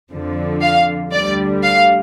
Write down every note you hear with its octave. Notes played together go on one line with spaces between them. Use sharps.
F2 D3 F3
F5
D2 D3 G3 D5
F5